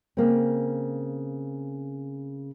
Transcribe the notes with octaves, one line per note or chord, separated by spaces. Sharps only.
C#3 A#3 C4